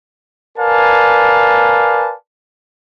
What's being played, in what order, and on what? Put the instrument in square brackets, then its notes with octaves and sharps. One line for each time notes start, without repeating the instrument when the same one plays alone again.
[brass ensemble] A#4 B4 D5 F5 G#5 A5